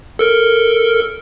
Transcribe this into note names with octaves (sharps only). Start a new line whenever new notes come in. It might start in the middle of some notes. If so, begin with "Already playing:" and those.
A4 A#4 F6